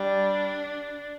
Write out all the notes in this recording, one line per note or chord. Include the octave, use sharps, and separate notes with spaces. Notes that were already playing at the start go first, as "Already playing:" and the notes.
Already playing: G3 D4